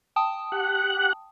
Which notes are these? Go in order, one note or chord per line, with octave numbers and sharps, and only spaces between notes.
G5 A5 D#6
G4 F#5 F#6